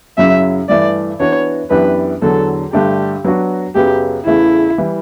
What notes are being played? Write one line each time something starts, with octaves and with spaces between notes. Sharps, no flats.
F#2 C#3 F#3 C#4 E4 E5
G2 E3 A3 D5
E3 B3 D4 F#4 B4 C#5
F#2 E3 B3 D4 G4 B4
E2 D3 F#3 A4
G2 D3 A3 D4 G4
F#3 B3 D4 F#4
F#2 C#3 F#3 B3 G4
E2 C#3 E3 A3 E4
E3 G3